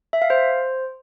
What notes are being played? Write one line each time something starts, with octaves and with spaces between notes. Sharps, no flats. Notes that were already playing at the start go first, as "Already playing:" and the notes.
E5
F5
C5